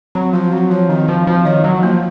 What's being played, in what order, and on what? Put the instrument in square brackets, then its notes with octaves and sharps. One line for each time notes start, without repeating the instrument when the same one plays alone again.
[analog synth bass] F#3 [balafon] C4
[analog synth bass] F3 [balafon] F#4
[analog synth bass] F#3 [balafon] C4
[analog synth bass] F3 [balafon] C#5
[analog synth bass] D#3 [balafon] C4
[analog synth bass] F3 [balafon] F#4
[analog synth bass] F3 [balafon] C4
[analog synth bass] D#3 [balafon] C#5
[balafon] F3 [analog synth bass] F#3
[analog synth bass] F3 [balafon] A#3